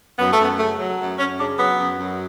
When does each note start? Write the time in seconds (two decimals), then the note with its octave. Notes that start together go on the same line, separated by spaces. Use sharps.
0.19 F#2 B3
0.32 A3
0.40 F#2 B3
0.58 C#3 A3
0.79 F#3
0.99 F#2
1.18 F#2 C#4
1.38 C#3 D4
1.58 F#3 B3
1.78 F#2
1.98 F#2